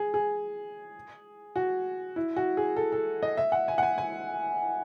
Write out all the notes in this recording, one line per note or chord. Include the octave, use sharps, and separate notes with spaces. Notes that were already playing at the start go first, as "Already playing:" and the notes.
Already playing: G#4
G#4
F#4
E4
F#4
G#4
A4
A4
D#5
E5
F#5
G#5
F#5
G#5
G#5